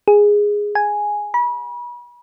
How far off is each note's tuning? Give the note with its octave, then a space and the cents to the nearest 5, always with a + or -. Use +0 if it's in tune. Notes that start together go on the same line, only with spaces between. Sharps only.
G#4 -5
G#5 +0
B5 -35